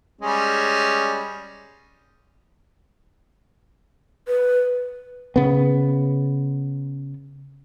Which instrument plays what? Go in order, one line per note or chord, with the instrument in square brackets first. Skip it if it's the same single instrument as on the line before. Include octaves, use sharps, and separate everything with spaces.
[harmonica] G3 G#3 C#4
[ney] B4
[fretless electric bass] C#3 B3